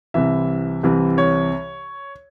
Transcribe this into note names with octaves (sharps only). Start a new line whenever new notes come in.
C2 C3 E3 E5
C2 C3 E3
C#5